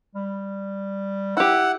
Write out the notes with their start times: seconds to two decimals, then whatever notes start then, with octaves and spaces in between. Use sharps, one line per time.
0.15 G3
1.37 E4 G4 F#5 E6